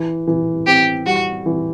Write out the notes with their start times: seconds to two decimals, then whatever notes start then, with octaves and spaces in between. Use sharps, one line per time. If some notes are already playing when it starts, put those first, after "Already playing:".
Already playing: E3
0.27 E3
0.67 C4 G4
1.06 G3 F#4
1.46 E3